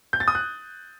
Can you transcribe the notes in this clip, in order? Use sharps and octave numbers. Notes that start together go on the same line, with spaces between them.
G6
A6
D#6
F#6